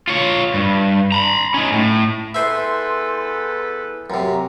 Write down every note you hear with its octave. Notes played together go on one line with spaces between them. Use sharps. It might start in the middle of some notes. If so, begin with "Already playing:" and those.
F4 C#5
G2
A#5 B5
C#4 D#4
A2
E2 A4 B4 C5 E5 C6
F#2 C3 A#5